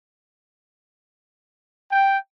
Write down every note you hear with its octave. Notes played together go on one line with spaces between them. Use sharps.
G5